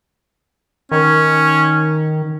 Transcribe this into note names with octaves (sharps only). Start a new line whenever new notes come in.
D#3 C#4